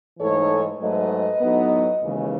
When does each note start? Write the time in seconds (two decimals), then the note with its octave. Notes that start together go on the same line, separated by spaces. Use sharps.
0.19 G#2 E3 A3 D#4 A4 C#5
0.79 G#2 F#3 A3 B4 D#5
1.41 A2 F#3 B3 D#4
2.02 D#2 C#3 E3 G#3